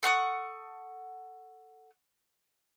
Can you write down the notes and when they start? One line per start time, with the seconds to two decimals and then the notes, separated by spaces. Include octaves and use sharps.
0.03 A4 F#5 C#6 D#6